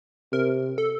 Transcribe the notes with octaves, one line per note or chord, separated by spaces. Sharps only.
C3 A#4
A4